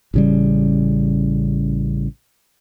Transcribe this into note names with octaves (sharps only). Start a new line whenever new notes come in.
A1 C#3 G3